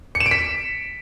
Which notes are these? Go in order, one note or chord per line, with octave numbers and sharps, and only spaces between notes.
C#7
E7
D7
B6